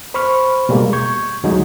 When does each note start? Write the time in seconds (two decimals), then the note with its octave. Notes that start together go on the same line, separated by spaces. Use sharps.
0.14 C5 B5 C#6 F6
0.69 B2 G3 G#3 A#3
0.93 C#6 G6 G#6
1.44 D2 F#3 G#3 D#4